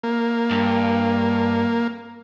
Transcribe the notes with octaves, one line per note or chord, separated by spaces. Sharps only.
A#3
G2